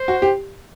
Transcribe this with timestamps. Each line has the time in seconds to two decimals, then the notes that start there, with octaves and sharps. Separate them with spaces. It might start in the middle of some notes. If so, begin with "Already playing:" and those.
Already playing: C5
0.08 F#4
0.22 G4